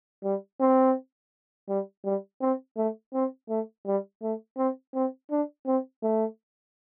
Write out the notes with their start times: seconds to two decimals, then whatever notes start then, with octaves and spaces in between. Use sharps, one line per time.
0.24 G3
0.60 C4
1.69 G3
2.05 G3
2.41 C4
2.77 A3
3.14 C4
3.49 A3
3.86 G3
4.22 A3
4.58 C4
4.94 C4
5.31 D4
5.66 C4
6.03 A3